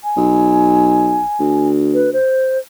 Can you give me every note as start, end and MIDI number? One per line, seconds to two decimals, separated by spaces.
0.04 1.68 80
0.17 1.21 35
1.40 2.16 38
1.94 2.10 71
2.13 2.58 72